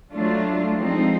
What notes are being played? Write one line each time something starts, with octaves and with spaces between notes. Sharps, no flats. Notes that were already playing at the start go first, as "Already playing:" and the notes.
F#3 A3 D4 F4
F3 G#3 C4 D#4